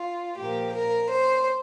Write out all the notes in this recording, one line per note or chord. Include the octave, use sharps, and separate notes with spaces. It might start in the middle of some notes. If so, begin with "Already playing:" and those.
Already playing: F4
A#2 F3 A#3 G4
A#4
C5